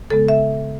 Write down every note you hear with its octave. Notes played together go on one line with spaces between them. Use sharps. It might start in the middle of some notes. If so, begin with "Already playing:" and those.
C#3 G#3 B3 A4
E5